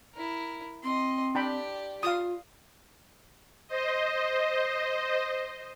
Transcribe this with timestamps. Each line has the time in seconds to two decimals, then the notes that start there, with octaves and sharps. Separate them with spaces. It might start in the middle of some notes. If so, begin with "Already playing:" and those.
0.14 E4 A#4
0.83 C4 D#5 C6
1.35 D4 G4 D5 G5 B5
2.03 F4 F5 D#6
3.68 C5 D#5